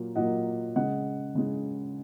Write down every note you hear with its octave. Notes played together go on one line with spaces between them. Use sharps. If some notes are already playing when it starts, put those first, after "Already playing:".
Already playing: A#2 F#3 A#3
A#2 F#3 A#3 D#5 F#5
C#3 G#3 D#5 F#5
C#3 G#3